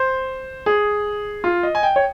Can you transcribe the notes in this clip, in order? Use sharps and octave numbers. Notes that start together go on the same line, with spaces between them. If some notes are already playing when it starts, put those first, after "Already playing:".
Already playing: C5
G#4
F4
D#5
G#5
G5
C#5